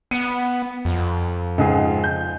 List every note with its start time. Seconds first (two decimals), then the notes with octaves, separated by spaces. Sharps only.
0.11 B3 C#7 D#7
0.85 F2
1.58 C#2 G#2 G#4
2.04 G6